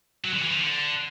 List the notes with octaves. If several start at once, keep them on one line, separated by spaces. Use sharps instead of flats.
F#3
D3
E3
F3
D3